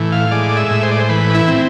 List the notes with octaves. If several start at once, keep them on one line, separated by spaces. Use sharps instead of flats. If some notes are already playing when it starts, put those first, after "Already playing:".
Already playing: A2 E3
F5
G#3 D5
E5
A2
C5
D5
C5
E3 B4
E4
C4